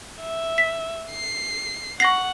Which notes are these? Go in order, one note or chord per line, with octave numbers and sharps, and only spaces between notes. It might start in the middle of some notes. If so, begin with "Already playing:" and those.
E5
B6
C7
F#5 C#6 A#6 C7